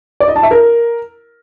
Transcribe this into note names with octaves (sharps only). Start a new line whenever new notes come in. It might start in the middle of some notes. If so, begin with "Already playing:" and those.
D5
D#5
A5
E5
A#4